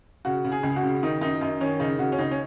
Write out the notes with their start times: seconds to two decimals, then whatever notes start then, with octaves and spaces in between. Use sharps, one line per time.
0.25 C#3 F#4
0.45 C#3
0.52 G#4
0.63 C#2
0.76 F#4
0.83 C#3
1.03 D#3 D#4
1.21 F#2 D#4
1.41 F#2 D#4
1.61 D#3 C#4
1.80 C#3 D#4
1.98 C#3 F#4
2.12 C#4
2.18 C#2 D#4
2.31 C#4